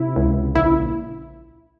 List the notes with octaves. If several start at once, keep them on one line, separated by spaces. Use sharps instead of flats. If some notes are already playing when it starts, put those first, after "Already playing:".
Already playing: C3 E4
C#2
A#1 E4